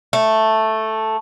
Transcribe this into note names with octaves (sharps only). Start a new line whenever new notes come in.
A3